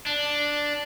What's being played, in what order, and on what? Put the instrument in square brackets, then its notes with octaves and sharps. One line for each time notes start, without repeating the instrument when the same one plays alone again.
[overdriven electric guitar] D4